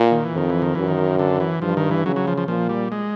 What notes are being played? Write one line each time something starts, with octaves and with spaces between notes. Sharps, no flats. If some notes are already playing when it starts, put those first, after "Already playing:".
Already playing: A#2
D#3
E3
F2 D#3
E3
D#3
F#2 E3
D#3
D3
E3
G2 F3
D#3
E3
C#3 F#3
F#3
F3
F3
A#2 F3
G3
G#3